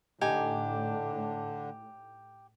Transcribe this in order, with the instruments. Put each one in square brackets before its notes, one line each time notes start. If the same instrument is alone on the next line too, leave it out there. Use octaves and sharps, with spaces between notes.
[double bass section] A2 [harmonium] D3 D4 [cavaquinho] D#4 G4 G#5